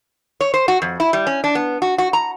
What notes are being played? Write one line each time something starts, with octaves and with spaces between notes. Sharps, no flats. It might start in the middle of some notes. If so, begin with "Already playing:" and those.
C#5
C5
F#4
F2
E4
G3
C#4
D4
B3
F#4
F#4
A#5